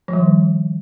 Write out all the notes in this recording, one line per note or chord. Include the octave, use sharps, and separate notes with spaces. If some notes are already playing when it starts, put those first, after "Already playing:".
F3
G3
D#3